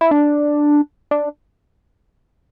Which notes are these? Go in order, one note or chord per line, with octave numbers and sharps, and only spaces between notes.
E4
D4
D4